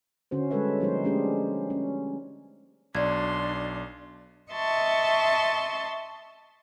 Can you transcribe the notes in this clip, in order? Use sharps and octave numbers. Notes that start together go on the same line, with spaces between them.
D3 C#4 F#4 C5
G3 G#3 A4 B4 C#5 E5
F3 G3 A#3 D#4 G4 C5
G#3 A3 C#4 D4 G4 G#4
C#4
B1 D4 D5 C6 G#6
D#5 E5 A5 C6 C#6